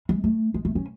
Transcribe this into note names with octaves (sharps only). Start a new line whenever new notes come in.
G#3
A3
G#3
A3
C#4